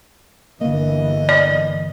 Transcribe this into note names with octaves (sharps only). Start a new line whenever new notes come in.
G1 D3 E3 A#3 D#5
D5